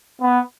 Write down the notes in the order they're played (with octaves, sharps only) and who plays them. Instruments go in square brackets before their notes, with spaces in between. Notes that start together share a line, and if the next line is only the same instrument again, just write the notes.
[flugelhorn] B3